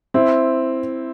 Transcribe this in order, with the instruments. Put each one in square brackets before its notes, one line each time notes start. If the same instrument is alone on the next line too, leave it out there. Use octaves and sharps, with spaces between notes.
[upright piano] C4 E4